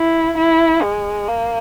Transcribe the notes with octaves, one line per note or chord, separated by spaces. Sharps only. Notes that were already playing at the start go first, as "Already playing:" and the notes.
Already playing: E4
E4
G#3
A#3